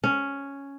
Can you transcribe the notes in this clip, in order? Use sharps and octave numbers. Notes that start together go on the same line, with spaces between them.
C#4